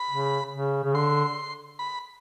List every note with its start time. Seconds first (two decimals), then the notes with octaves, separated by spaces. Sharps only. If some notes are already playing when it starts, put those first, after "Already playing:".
Already playing: B5
0.10 C#3
0.52 C#3
0.84 C#3
0.94 D3 C6
1.79 B5